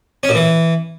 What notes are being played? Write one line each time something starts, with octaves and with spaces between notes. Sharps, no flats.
C#4
A#2
E3